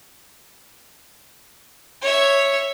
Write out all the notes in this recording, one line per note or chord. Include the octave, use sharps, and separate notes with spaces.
C#5 E5